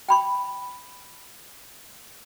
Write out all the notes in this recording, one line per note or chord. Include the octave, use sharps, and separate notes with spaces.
G5 B5 C#6